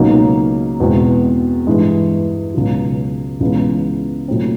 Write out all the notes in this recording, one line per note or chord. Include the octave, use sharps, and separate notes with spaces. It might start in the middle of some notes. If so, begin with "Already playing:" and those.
Already playing: C#2 B2 F#3 A#3 D#4
E2 B2 G#3 C4
G2 E3 G#3
C#2 B2 F#3
C#2 C#3 E3 G#3 B3
A#2 F#3 A3 C4